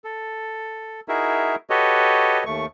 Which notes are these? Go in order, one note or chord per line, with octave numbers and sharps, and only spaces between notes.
A4
D#4 E4 F#4 G#4 A#4 E5
F#4 G4 A4 B4 C#5 D#5
D#2 A3 C#6